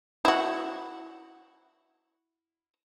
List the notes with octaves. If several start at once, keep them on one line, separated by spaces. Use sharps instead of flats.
E4 F#4